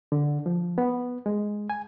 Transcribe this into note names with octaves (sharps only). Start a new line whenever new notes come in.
D3
F3
B3
G#3
G#5